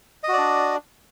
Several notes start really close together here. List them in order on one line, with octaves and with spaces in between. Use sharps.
D#5 F#4 D5 D4